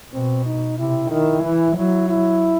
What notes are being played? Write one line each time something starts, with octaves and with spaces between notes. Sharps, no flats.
B2 C4
D#4
C3 E4
D#3 E4
E3
F#3 E4
E4